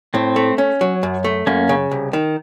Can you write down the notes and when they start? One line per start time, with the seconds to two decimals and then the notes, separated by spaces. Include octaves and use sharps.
0.14 A2 C4
0.36 A3
0.58 C#4
0.81 F#3
1.03 F#2
1.24 A3
1.47 F#2 A#3 C#4
1.69 C#3
1.91 C2
2.13 D#3